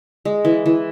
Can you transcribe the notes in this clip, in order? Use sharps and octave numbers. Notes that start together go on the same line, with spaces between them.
G#3
E3
E3